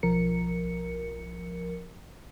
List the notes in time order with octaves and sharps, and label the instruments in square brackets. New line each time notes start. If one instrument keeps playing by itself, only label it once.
[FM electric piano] B1 F3 A#4 C#7